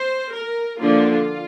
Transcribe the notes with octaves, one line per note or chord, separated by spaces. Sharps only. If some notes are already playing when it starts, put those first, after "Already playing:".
Already playing: C5
A#4
D3 F3 A#3 D4 F4